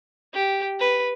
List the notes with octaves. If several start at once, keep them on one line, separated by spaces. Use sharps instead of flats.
G4
B4